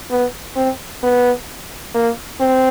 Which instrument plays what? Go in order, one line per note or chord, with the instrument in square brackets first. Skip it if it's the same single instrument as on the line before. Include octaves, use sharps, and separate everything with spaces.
[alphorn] B3
C4
B3
A#3
C4